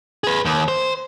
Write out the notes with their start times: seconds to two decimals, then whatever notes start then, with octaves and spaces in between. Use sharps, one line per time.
0.24 G#4 B4
0.45 D#2
0.68 C5